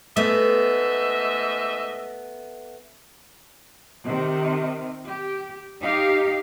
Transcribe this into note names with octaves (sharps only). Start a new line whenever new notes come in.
G#2 A3 B3 D#5 E5
C3 D#3
G4
D#4 G4 F5